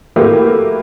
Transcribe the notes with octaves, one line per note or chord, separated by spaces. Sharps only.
A3 A#3 E4 F#4 G4 B4